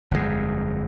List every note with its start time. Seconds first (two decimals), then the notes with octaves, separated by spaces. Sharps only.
0.11 G1 F2 G#2 G#3